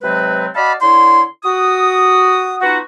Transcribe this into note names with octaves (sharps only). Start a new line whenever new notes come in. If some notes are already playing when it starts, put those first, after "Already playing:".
C3 F#3 G#3 C4 B4
F#4 D5 D#5 F5 A5 B5
D3 E4 C#5 C6
F#4 D#6
B3 D#4 F4 F#4